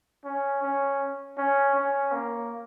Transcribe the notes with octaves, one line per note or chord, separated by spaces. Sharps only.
C#4
C#4
C#4
C#4
A#3